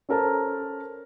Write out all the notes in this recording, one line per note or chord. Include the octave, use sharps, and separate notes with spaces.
C#4 A4 A#4 C5 A5